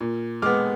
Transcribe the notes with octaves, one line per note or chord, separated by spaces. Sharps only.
A#2
G#3 B3 D6 F6